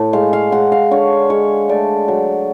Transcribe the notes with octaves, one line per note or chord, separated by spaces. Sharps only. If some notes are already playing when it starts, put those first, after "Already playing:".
Already playing: A2
G#3 F5
F5
G#3 F#5
F5
D3 C#5
G#3 C#5
A3 D5
F#3